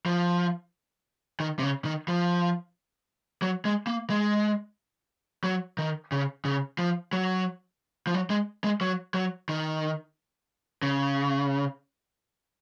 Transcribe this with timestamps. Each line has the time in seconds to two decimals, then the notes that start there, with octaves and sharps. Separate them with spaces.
0.06 F3
1.40 D#3
1.59 C3
1.62 C#3
1.85 D#3
2.08 F3
3.42 F#3
3.65 G#3
3.87 A#3
4.10 G#3
5.44 F#3
5.78 D#3
6.12 C#3
6.45 C#3
6.78 F3
7.13 F#3
8.07 F3
8.14 F#3
8.30 G#3
8.64 G#3
8.81 F#3
9.14 F#3
9.49 D#3
10.83 C#3